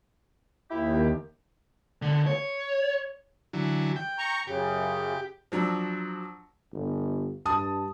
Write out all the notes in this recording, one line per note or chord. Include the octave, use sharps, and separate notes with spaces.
D#2 E4 G4
D3
C#5
D3 E3 F#3
G5
A#5 C#6
F#2 C#3 G4
F3 F#3 D4 A#5 E6
G1
G2 A5 D#6